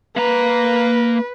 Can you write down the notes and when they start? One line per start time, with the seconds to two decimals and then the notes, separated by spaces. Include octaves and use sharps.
0.17 A#3 B4 A#5